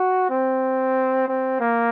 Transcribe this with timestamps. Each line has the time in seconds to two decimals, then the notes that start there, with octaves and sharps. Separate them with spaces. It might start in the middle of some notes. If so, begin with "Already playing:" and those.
Already playing: F#4
0.30 C4
1.28 C4
1.60 A#3